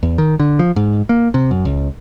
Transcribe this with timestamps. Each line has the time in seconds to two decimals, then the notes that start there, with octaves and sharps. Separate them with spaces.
0.03 E2
0.18 D#3
0.40 D3
0.59 F3
0.76 G#2
1.09 A#3
1.34 C3
1.51 F#2
1.65 C#2